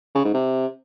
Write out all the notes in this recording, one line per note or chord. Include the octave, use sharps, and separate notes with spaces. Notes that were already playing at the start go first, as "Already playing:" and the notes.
C#3
G#2
C3